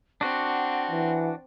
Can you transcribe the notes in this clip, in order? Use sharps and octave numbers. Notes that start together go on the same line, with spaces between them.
C4 D4 F#4 F#5
E3